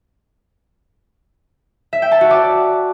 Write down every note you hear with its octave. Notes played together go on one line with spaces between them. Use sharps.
E5
G5
A5
F#4
D5